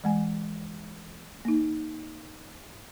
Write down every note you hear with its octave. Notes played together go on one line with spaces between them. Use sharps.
E3 G#3 G#5
A#3 D#4